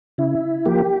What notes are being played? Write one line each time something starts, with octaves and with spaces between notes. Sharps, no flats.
C#3 E4
F3 A#3 G4